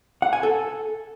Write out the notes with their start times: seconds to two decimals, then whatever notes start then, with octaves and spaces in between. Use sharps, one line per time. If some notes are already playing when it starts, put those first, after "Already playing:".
0.22 F#5
0.33 G#5
0.43 A4